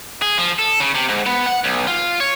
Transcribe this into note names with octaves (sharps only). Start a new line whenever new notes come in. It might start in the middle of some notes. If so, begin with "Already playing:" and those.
G#4
F3
A4
C#3
C3
G#2
B3
F#5
B1
F4
C#5